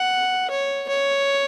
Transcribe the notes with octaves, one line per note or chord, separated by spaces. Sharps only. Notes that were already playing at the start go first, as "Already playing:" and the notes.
Already playing: F#5
C#5
C#5